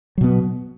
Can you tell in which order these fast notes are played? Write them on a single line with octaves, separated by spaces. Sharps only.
F#3 B2 B3